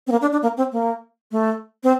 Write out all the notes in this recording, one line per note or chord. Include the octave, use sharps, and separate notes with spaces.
C4
A#3
D4
D4
A#3
C4
A#3
A3
C4